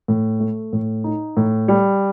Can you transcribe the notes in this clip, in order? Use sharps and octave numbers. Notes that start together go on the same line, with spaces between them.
A2
A3
A2
D#4
A2
G3